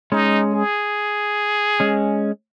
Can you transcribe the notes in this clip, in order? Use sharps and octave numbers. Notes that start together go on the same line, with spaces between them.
G#3 C#4 D#4
G#4
G#3 C#4